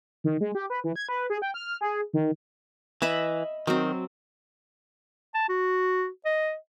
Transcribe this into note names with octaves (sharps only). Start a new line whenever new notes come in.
D#3
G#3
G4
B4
E3
G#6
B4
G#4
G5
F6
G#4
D#3
E3 D#5 E5 B5
D#3 F#3 C4
A5
F#4
D#5